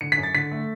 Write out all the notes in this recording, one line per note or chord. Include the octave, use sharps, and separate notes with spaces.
D3 C#7
B6
F#2
A6
D3 B6
A3